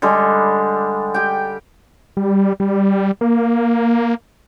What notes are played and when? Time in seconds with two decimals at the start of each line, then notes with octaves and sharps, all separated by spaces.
0.02 D3 G3 G#3
1.14 G4 G5
2.17 G3
2.60 G3
3.21 A#3